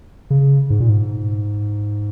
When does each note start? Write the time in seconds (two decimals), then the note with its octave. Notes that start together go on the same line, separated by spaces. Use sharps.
0.30 C#3
0.70 G#2
0.80 A#2
0.89 G#2